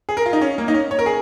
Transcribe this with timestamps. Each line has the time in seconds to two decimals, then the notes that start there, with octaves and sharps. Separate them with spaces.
0.09 G#4
0.17 A#4
0.26 F4
0.33 D#4
0.41 C#4
0.58 A#3
0.68 D#4
0.74 C#4
0.91 C#5
0.99 A#4
1.06 G#4